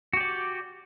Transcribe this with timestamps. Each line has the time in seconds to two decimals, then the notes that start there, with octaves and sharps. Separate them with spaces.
0.13 F#4
0.17 G4
0.20 D5